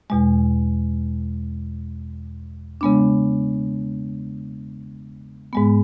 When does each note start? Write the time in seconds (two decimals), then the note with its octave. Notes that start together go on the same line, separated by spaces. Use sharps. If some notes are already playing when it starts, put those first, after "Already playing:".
0.10 E2 B2 G#3
2.81 C#3 G#3 B3 D4
5.53 G#2 G#3 B3